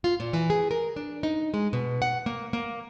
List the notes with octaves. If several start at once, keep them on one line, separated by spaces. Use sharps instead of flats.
F4
A#2
E3
G#4
A#4
D4
D#4
G#3
B2
F#5
A#3
A#3